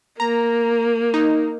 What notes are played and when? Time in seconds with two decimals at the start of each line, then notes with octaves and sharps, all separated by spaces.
0.20 A#3 A#5
1.14 D#4